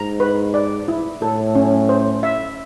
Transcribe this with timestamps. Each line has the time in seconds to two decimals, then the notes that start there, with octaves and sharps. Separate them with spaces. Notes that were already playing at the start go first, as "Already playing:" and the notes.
Already playing: G#2 A#5
0.20 B4
0.54 D5
0.88 E4
1.22 A2 A4
1.55 C#4
1.89 C5
2.23 E5